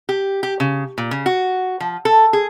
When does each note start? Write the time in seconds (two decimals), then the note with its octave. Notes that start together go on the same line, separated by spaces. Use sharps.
0.09 G4
0.43 G4
0.60 C#3
0.98 A#2
1.11 C#3
1.26 F#4
1.80 F3
2.05 A4
2.33 G#4